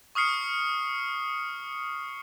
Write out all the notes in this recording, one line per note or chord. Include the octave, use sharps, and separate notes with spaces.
C#6 D#6 F6 C7 C#7